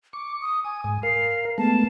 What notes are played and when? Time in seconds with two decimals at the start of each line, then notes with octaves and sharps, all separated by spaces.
0.13 C#6 D6
0.42 D#6
0.64 G#5 D#6
0.84 G#2
1.03 A#4 F5 C7
1.58 G#3 A3 B3 A5